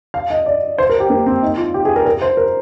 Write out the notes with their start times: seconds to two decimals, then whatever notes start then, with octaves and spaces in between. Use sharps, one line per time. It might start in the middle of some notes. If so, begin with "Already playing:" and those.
0.14 F5
0.31 D#5
0.46 D5
0.78 C5
0.90 A#4
1.00 G4
1.10 A#3
1.26 C4
1.42 D#4
1.57 F4
1.74 G4
1.85 G#4
1.96 A#4
2.06 A#4
2.22 C5
2.37 A#4